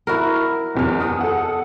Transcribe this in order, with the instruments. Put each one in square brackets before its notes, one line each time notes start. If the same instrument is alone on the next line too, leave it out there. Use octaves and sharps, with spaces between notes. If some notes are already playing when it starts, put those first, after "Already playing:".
[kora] E4 F#4 A#4
[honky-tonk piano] F#1 E2 F6
D#6
A4 F#5